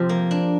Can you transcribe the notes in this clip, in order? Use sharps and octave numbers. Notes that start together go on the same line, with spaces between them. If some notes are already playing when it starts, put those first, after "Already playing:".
Already playing: C3 F3
A#3
D4